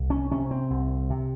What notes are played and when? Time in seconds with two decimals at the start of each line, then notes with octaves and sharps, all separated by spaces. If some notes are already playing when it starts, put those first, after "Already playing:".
Already playing: C2
0.10 C#4
0.31 C3 C#4
0.51 C4
0.70 C2
1.10 C3